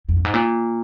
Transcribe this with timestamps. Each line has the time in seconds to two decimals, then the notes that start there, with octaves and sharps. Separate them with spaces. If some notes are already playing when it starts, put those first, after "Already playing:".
0.09 F2
0.16 G2
0.25 G#2
0.34 A#2